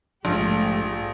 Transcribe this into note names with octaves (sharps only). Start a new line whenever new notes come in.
A#1 G#2 F3 A3 D4 G4